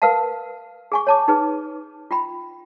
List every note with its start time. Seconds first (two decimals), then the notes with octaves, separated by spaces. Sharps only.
0.02 A#4 B4 F5 F#5 A5
0.92 G#4 G#5 C#6
1.07 C#5 A5 D6
1.28 D#4 G#4 B4
2.11 F4 G5 B5